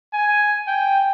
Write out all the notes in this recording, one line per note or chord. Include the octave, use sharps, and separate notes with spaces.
G#5
G5